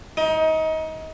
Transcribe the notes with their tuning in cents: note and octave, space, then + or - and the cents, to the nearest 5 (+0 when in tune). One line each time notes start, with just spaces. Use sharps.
D#4 +25